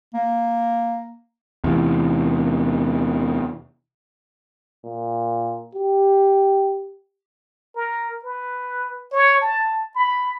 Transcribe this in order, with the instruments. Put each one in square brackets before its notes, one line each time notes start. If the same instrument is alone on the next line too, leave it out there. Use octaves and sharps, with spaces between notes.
[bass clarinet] A#3
[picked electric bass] E2 C3
[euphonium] A#2
G4
[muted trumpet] A#4
B4
C#5
A5
B5